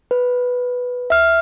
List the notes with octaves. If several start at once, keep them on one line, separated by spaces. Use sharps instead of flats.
B4
E5 F6